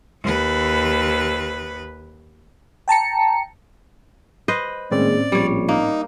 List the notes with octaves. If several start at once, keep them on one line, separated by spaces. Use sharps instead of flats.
D#2 B4
G5 A5 A#5 C#7
B4 C5 D#5
A2 D#3 G#3 A#3 C4 C#4 D5
A#1 G3 C#5
A#3 D#4